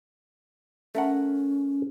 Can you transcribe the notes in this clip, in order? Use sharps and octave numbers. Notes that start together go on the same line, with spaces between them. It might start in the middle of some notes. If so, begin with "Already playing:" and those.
A3 C#4 A#4 F#5